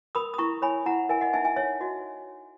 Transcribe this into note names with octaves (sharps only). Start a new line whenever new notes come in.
A#4 B5 D#6
D#6
E4 A#5 C#6
C#5 G#5 B5
E4 F#5 A#5
A#4 E5 G#5
D#5 F#5
D#4 E5 G#5
E5 G#5
C#5 E5
F#4 D#5